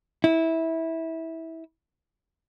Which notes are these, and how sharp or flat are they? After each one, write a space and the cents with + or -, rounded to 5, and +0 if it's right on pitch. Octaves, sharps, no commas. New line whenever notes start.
E4 -20